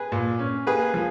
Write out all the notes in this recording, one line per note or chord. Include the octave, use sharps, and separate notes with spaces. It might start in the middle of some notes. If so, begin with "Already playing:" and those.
Already playing: G#4 B4
A#2
C#4
A#3 G#4 B4
F3